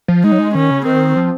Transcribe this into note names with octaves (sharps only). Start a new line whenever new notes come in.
F3
G#3 D#4
F#3
G#3
D#3 C#4
C#3
D#3 C4
F3